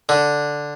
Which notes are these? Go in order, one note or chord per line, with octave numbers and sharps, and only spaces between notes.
D3